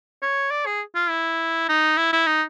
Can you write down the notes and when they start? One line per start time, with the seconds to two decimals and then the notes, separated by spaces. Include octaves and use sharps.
0.22 C#5
0.51 D5
0.66 G#4
0.95 F4
1.10 E4
1.69 D#4
1.97 E4
2.13 E4
2.27 D#4